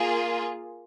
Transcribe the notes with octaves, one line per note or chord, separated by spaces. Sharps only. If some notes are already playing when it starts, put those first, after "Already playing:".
Already playing: A#3 F4 G#4